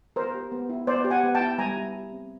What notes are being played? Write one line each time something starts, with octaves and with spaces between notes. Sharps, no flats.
B3 A#4 C5
G4
B3
E4
B3 C5 D5
G4
F#5 G#5
B3
G5 A5
E4
G3 G#5 A#5
E4
G4
C4